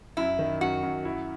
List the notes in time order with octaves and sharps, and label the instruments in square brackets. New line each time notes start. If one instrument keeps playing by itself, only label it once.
[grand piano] F#2 [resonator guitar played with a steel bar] E4
[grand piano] D#3
[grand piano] F#2 [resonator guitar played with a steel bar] F#4
[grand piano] F#2
E4